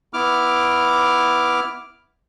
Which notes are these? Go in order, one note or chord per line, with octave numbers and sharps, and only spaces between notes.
B3 E4 D6 F6